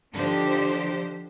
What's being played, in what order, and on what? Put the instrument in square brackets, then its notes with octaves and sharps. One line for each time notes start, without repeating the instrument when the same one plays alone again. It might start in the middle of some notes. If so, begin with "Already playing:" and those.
[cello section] D3 F3 D4 D#4 G4 C5